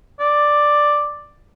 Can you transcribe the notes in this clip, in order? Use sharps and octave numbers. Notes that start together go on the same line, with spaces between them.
D5